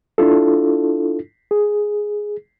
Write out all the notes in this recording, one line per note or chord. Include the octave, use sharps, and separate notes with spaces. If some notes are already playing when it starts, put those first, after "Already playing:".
D4 E4 F4 A4
G#4